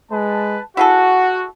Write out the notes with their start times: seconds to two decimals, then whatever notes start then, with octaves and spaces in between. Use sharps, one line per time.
0.11 G#3 B4 A5
0.77 E4 F#4 G#4 A4 F#5